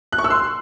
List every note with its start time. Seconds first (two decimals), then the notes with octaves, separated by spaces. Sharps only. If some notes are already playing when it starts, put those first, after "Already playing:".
0.12 F#6
0.18 C#6
0.24 E6
0.30 C6